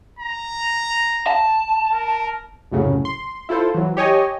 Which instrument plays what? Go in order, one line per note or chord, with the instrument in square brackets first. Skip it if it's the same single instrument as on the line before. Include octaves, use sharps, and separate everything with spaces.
[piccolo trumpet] A#5
[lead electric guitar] A5
[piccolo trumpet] A#4
[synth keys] C2 F#2 A2 C#3 F#3
C6
E4 F4 A4 C5
E3 F#3
G4 C#5 D#5 G#5